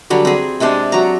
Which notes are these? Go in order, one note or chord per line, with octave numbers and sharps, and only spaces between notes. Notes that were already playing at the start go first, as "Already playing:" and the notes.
D3 F#3 G3
C4 G#4
C3 G#3 C4 D4
F#3 A#5